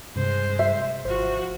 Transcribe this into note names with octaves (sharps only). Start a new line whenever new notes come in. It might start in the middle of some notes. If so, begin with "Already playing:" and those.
G2 C3 G#3 C5
E5
G#1 F3 F#4 C5